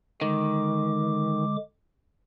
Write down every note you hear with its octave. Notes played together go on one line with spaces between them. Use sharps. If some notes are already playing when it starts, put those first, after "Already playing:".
D3 D#3 G#3 D6